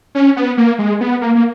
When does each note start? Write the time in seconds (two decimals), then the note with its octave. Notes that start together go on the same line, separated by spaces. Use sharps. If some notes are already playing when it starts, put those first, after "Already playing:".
0.15 C#4
0.37 B3
0.57 A#3
0.79 G#3
1.01 B3
1.21 A#3
1.35 A#3